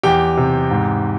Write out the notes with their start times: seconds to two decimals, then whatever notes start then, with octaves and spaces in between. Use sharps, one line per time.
0.03 E2 G4 G5
0.37 C3
0.71 G#2